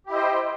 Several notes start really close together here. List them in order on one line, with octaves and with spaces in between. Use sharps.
G4 E4 D#5 C5 G5